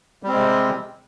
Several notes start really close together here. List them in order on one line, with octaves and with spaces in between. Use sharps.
G3 C4 G#3 C3